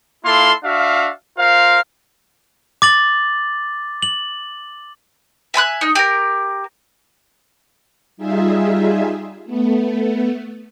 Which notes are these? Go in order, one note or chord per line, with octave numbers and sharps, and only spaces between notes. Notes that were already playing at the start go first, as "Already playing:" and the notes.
A#3 E4 F4 A4 F5 C6
D4 F#4 E5 F5
F4 A#4 C5 F5
D6 A6 F#7
F#7
E5 G#5 B5 F#6
D#4
G4 A#4
G3 D#4 F4 G#4 E5
A3 B3